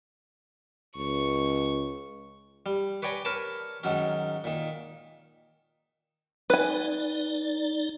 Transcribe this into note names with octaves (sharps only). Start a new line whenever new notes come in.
C#2 C#6
G3
B4 C#5 D5 G5 G#5 A#5
A#4 B4 C#5 A5
G#2 D#3 F#3 C#4
A#2 D#3
D#4 B4 D5 G#5